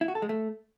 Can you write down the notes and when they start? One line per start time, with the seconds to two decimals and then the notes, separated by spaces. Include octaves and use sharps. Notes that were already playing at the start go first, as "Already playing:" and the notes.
0.01 E4
0.08 F#4
0.15 A4
0.22 G#3
0.29 A3